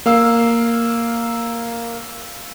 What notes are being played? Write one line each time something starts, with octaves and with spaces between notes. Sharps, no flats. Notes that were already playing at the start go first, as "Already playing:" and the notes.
A#3 F5 E6